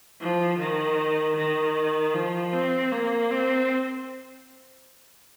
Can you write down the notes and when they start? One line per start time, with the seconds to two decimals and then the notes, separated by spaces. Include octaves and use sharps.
0.20 F3
0.58 D#3
1.36 D#3
2.14 F3
2.52 C4
2.91 A#3
3.30 C4